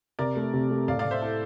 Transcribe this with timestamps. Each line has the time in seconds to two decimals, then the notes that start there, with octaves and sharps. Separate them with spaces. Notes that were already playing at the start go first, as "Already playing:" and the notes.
0.19 C3 A#4 D5
0.36 A3
0.54 C3
0.71 A3
0.88 A2 D5 F5
0.99 D5 F5
1.05 A2
1.11 C5 E5
1.22 E4 A4